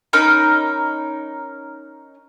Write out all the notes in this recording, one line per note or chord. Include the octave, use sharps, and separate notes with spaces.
C#4 D#4 A#4 B5